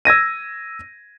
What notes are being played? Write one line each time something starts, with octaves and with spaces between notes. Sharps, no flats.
E6 G#6 A#6 D#7